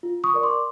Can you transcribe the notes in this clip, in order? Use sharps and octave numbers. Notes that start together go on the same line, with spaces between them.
F4
C#6 D#6
A#4 D5
C6 D6